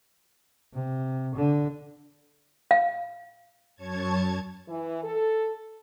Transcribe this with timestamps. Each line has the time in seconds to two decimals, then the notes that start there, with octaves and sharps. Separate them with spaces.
0.74 C3
1.35 D3
2.71 F5
3.76 F#2 C#5 A5 G#6
4.68 E3
5.03 A4